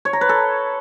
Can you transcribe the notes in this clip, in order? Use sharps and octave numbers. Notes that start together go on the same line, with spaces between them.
C#5
A#5
B4
A4